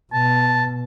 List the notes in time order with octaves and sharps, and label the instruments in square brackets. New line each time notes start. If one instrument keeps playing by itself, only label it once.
[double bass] B2 [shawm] A5